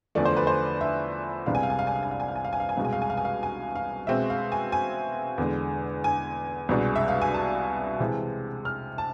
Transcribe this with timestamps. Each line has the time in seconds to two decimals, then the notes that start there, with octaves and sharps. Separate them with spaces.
0.15 E2 D3 F3 A3 D5
0.25 C5
0.37 B4
0.47 C5
0.81 E5
1.46 C2 C3 G#3 B3 D4 F5
1.55 G#5
1.63 F5
1.70 G#5
1.79 F5
1.87 G#5
1.96 F5
2.03 G#5
2.11 F5
2.20 G#5
2.28 F5
2.36 G#5
2.45 F5
2.53 G#5
2.60 F5
2.69 G#5
2.77 C2 B2 G#3 F5
2.85 G#5
2.93 F5
3.02 G#5
3.10 F5
3.17 G#5
3.25 F5
3.43 G#5
3.75 F5
4.07 B2 G#3 C4 E5
4.30 F5
4.52 G#5
4.72 G#5
5.38 E2 D3 G#3
6.04 G#5
6.69 C2 B2 G#3 D4
6.96 E5
7.08 F5
7.22 G#5
7.34 A5
8.00 C3 E3 G#3
8.65 F6
8.98 A5